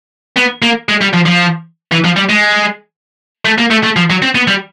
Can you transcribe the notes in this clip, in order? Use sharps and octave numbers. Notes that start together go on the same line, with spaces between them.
B3
A#3
G#3
G3
F3
F3
E3
F3
G3
G#3
A3
A#3
A3
A3
F3
F#3
C4
B3
G3